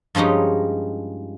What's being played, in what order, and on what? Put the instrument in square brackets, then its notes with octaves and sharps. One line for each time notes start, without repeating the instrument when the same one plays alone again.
[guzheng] G2 F3 G#3 C#4 D#4